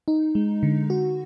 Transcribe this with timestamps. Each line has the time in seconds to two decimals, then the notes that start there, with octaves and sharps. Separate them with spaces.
0.08 D#4
0.35 G#3
0.63 D3
0.90 F#4